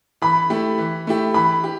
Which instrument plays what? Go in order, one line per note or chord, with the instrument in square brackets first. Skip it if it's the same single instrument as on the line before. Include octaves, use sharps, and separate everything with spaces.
[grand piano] E3 [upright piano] B5
[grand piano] A3 E4 G4
E3
A3 E4 G4
[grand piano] E3 [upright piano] B5
[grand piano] G4